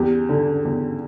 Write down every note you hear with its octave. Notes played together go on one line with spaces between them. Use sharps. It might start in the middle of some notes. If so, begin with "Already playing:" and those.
Already playing: E2 G4
D3
E2